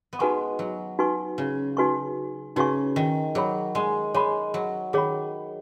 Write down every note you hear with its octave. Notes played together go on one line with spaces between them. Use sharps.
B3
G#3 D#4 F#4 B4 G#5 C#6
F#3
D#4 F#4 B4 G#5 C#6
C#3
D#4 F#4 B4 G#5 C#6
C#3 D#4 F#4 B4 G#5 C#6
D#3
F#3 G#4 C#5 B5
G#3
G#3 G#4 C#5 B5
F#3
D#3 G#4 C#5 B5